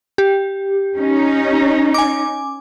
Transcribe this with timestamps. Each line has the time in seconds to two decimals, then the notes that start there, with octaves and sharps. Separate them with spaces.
0.18 G4
0.96 C#4 D#4
1.94 G#5 D6